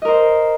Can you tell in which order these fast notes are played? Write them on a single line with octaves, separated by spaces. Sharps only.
D#5 A#4 C5